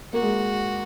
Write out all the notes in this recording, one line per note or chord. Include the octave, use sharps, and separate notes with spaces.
A#3 F#4
G#3